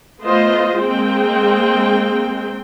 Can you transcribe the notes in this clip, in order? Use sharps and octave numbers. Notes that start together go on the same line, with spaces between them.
A3 B3 F4 C5 D#5
G#3 A#3 C4 G5